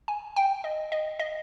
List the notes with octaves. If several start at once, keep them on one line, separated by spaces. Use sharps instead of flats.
G#5
G5
D#5
D#5
D#5